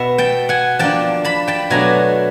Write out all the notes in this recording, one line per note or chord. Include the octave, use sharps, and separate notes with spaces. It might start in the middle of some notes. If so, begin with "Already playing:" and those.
Already playing: B2 B3 E5
G5 A5
F#5 G#5
F3 A#3 D4 G5 A5
A5 B5
G5 A5
B2 F#3 A3 D4 G#5 A#5